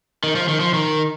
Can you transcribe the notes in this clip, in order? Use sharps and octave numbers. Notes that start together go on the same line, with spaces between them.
D#3
F3
D#3
F3
D#3